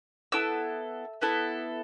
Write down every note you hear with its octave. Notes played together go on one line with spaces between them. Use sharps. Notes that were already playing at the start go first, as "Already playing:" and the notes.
B3 E4 A4 E6
B3 E4 A4